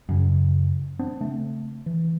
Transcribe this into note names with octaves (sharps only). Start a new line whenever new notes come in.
F#2 C#3
B3 C4 D4
C#3 A3
E3